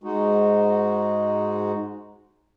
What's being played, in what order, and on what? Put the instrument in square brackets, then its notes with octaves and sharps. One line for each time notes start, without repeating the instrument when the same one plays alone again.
[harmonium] G#2 G#3 D#4 F#4